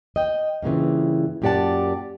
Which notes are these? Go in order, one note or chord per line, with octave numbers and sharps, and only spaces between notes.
D#5 G5
G2 A#2 C#3 E3
F#2 A#2 G4 D5 F#5 A5